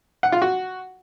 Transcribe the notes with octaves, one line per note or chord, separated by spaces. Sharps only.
F#5
F4
F#4